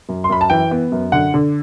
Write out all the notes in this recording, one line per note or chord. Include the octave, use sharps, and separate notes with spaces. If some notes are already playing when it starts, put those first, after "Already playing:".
F#2
C6
F#2 B5
A5
E3 G5
B3
F#2
D3 F#5
D3